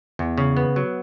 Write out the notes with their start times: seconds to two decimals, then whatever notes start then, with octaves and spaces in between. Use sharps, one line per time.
0.19 E2
0.38 C#3
0.57 B3
0.76 F#3